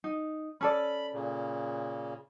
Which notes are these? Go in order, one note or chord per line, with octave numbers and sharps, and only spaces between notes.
D#4
C#4 A4 D5 B5
A#2 C#3